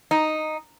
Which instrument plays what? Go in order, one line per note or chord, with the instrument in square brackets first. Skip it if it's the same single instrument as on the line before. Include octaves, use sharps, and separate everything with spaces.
[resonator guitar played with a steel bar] D#4